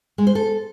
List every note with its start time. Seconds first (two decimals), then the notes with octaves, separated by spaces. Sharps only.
0.18 G#3
0.27 C5
0.35 A4